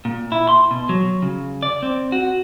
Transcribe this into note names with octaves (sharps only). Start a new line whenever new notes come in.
A#2
E4
C6
B2
F#3
C#3
D5
C4
F#4